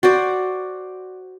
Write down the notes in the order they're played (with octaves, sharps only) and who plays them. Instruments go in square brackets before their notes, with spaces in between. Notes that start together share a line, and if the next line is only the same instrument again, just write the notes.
[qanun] F#4 C5 D5